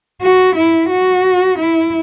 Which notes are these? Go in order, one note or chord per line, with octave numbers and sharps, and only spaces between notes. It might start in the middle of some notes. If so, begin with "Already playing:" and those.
F#4
E4
F#4
E4